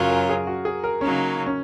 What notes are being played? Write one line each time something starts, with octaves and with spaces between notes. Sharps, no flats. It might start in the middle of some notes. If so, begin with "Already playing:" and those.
Already playing: F#2 C#3 F#3 C#4 F4 A#4
A#4
G#4
F#4
G#4
A#4
C#3 F#3 A#3 C#4 D#4
C#4